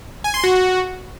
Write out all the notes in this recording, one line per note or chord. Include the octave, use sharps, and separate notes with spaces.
G#5
C6
F#4